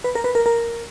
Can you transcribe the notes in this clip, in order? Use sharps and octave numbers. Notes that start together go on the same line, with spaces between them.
B4
A#4
B4
A#4
A#4